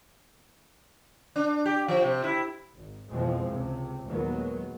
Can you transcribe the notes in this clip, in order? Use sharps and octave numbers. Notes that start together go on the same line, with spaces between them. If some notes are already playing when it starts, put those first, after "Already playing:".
D4
G4
F3
C3
E4
G#1
F2 B2 E3 F3 G#3 C4
C#2 C3
D#2 A#2 D#3 F#3 G#3 B3